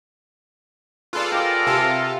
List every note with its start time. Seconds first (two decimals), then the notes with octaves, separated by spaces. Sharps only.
1.13 F4 G#4 A4 B4 D5
1.32 G4 A#4 D#5
1.66 C3 F4 A4 E5 G#5 A5